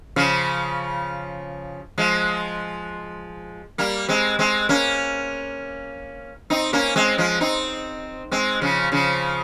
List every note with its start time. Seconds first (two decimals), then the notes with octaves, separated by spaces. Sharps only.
0.16 C#3 F3
1.98 F3 G#3
3.78 G3 A#3
4.09 G#3 C4
4.39 G#3 C4
4.69 A#3 C#4
6.50 C4 D#4
6.73 A#3 C#4
6.96 G#3 C4
7.18 F3 G#3
7.40 C4 D#4
8.32 G#3 C4
8.61 C#3 F3
8.92 C#3 F3